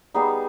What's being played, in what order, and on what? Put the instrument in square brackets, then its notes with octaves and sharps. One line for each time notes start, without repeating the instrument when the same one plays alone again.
[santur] G3 B3 D#4 G#4